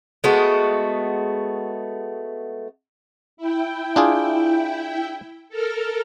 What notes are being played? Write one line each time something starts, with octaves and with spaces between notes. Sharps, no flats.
G#3 A3 B3 F#4
E4 G5
D4 F4 G#4
A4 A#4 F6